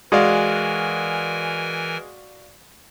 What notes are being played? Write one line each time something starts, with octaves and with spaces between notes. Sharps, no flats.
E3 G#3 F#4 A#4 D5 F5 G#5